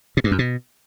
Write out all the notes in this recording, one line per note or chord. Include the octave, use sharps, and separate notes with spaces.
B2
G2
F#2
B2